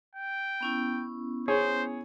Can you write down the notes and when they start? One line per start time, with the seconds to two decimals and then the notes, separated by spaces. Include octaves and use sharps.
0.15 G5
0.61 B3 C#4 E4
1.48 G#4 C5 C#5